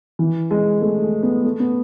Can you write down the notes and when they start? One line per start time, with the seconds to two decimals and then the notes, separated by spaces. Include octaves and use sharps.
0.19 E3
0.51 G#3
0.82 A3
1.02 A3
1.23 B3
1.45 A3
1.60 B3